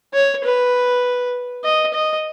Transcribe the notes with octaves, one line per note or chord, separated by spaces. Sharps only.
C#5
B4
D#5
D#5